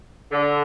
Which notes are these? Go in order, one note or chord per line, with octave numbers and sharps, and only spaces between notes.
D3